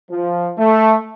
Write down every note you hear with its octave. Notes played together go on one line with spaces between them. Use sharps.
F3
A3